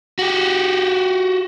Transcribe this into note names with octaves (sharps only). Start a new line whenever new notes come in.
F#4 G4